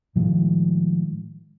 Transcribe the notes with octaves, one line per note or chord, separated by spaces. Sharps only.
A2 D#3 F3 G#3